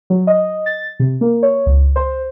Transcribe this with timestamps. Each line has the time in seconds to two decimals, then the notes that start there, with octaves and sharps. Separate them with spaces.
0.10 F#3
0.27 D#5
0.66 A6
1.00 C3
1.21 A#3
1.43 C#5
1.66 C#2
1.96 C5